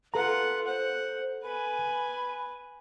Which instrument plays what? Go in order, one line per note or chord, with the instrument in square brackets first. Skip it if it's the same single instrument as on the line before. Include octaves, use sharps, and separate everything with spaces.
[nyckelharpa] F4 F#5 [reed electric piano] A4 A#5 [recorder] B4
[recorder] C5 [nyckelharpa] F#5
[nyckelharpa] B4 G#5 [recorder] B5